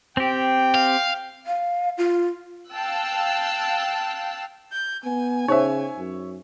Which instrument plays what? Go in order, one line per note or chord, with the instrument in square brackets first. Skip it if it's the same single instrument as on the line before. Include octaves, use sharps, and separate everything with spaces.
[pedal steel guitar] C4 G4 [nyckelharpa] G5
[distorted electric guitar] F5
[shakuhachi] F5
F4
[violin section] F5 G5 A5 E6 F#6
[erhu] G6
[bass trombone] B3 [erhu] G#5
[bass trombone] C#3 [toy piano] D#4 C5 [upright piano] C#5 E5
[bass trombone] F#2